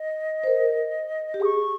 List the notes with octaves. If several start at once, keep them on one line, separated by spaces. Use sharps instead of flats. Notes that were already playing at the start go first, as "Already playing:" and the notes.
Already playing: D#5
C5
A#4
G4
G#4 D#6
C#6